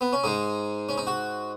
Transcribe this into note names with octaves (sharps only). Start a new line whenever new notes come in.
B3
C#4
G#2 G#3 D#4
C#4
D#4
F#4